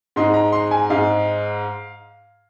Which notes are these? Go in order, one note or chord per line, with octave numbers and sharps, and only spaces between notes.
G#2 G#3 D#4 C6
A#5
C6
G#5
G#2 G#3 D#4 F5